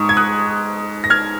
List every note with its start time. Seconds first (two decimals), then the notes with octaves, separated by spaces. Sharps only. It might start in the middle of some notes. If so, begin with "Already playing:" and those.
Already playing: G#2 C#6 D#6
0.09 G#6
0.17 D#6 F#6
1.04 A#6
1.10 F6 G#6